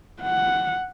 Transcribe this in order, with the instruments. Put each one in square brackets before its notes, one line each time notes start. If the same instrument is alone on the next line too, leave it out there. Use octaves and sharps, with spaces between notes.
[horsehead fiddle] F#5